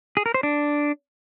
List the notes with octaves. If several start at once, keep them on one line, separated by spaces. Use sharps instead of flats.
G#4
A#4
C5
D4